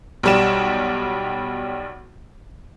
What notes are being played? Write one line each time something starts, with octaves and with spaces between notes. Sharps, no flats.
B1 G3 E7